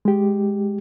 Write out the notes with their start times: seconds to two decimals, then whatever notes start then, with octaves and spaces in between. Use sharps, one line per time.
0.05 G#3 G4